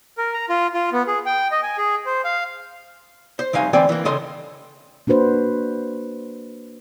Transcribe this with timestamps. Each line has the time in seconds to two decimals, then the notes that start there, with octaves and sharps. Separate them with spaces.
0.18 A#4
0.34 A#5
0.49 F4
0.74 F4
0.93 B3
1.07 G#4
1.26 G5
1.51 D#5
1.63 G#5
1.78 G#4
2.06 C5
2.25 F5
3.39 C5
3.53 C2 C3 D#4 F5 G#5
3.73 D2 E3 C4 D5 G5 G#5
3.89 E3 A#3
4.05 C#3 A4 D#5 C6
5.07 A#3 D4 F#4 B4 C5